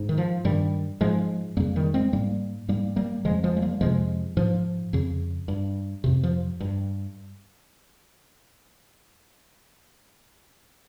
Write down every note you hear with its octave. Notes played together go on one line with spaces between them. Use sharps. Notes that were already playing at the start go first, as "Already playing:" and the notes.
Already playing: G#2
D#3
F3
G2 D#3 G3
G#2 F3 G#3
F2 C#3 G3 A#3
D#3 G3
G#3 C4
G#2 G3 A#3
G#2 G3 A#3
G3 A#3
F2 C#3 F3 G#3
F3 G#3
G#3
G3 A#3
F2 C3 F3 G#3
G#2 F3
F2 C#3
G2
F2 C3
F3
G2